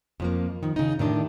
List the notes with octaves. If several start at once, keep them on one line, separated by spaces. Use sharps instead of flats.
F2 F3 A#3
D#3 F3
C#3 D#4
A2 D#3 D4 G4